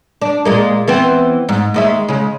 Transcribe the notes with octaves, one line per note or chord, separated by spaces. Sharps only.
D4
A#2 G#3 A#3
E3 B3 C4
G#2
D#2 G#3 E5
C#3 G#3